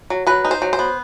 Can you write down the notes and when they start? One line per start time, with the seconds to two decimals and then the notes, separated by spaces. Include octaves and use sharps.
0.10 F#3
0.27 F#3 B4
0.45 D#4
0.51 C5
0.62 F#3
0.73 C5
0.79 B3